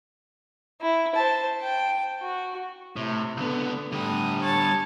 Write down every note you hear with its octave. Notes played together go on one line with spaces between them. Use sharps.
E4
C5 A5
G5
F#4
A2 C3
C#2 D3 B3
A2 D3 G3 D#6
C#5 A5 A6